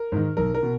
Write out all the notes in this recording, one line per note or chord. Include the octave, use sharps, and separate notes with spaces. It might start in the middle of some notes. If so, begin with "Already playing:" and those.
Already playing: A#4
G#2 D#3
B1 A#4
A#4
B2